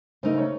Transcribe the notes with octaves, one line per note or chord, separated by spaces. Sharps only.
C#3 A3 D#4 A#4 C5
C#5